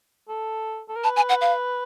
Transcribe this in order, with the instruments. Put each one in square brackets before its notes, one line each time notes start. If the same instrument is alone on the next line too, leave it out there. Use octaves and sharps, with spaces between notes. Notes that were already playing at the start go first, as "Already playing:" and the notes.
[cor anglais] A4
A4
A#4
[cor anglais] B4 [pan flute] A5
[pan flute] G#5
F#5
F5